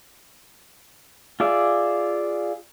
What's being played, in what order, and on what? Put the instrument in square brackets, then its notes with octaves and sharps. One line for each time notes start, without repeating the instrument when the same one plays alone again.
[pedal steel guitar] F4 G#4 D5 E5